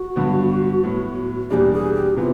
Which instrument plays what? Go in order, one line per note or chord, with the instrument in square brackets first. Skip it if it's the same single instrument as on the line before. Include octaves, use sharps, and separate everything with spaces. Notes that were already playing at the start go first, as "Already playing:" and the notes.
Already playing: [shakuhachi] F#4
[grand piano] G2 D3 F#3 B3
A2 F#3 B3
[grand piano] E2 B2 G3 A#3 D4 [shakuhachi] G4 G#4
[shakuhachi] G#4
G4
[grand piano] C3 E3 B3 [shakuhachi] F4